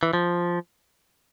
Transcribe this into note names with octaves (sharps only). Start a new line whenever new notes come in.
E3
F3